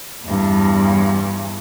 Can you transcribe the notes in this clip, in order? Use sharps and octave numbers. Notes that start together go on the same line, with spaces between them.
E2 G2